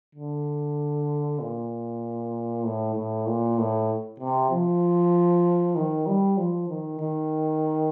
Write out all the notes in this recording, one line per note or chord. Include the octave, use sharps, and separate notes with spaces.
D3
A#2
A2
A2
A#2
A2
C3
F3
D#3
G3
F3
D#3
D#3